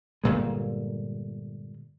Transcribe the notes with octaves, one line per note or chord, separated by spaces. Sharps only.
G1 A#2 G#3